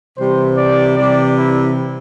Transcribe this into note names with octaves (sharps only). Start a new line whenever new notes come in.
C3 E3 G3 C5
D5
C3 E3 G3 D5
E4